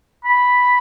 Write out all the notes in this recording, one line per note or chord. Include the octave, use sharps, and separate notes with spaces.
B5